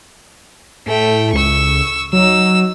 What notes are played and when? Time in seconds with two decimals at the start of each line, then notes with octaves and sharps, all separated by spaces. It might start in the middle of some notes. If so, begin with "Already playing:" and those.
0.87 A2 A3 G5
1.33 C#2 C#6 E6
2.13 F#3 D#4 E6